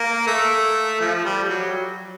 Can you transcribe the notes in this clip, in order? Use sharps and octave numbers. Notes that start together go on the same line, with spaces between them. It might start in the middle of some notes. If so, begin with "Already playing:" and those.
Already playing: A#3
A3
F3
G3
G3
F#3